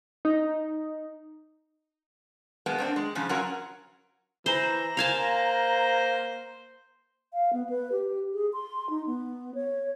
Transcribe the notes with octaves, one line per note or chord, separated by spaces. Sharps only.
D#4
B2 G#3 A#3 B3
A3 C4 D4
G#3
G#2 C#3 F3
F#3 C#4 F4 F#4 A#4
E3 C5 A#5
A#3 C5 F5 G#5 A5
F5
B3
B4
G4
G#4
C6
D#4
B3
C#5